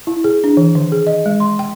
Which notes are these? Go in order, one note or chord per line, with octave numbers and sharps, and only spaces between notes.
E4
G#4
D4
E3
D#3
G#4
D#5
G#3
C6
G5